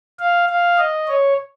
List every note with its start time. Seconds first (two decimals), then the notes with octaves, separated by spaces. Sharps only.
0.19 F5
0.49 F5
0.78 D#5
1.08 C#5